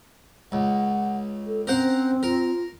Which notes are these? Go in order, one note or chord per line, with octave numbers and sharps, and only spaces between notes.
C#2 F#5
A4
C4 C#4 A#4 C5 F#5
F4 A#4